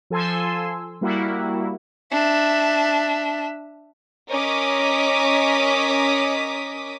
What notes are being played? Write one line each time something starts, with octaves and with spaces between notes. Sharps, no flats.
F3 A4 G#5 C6 E6
G3 A#3 E4 F#4
D4 E5
C#4 A#4 D#5 D6 D#6 B6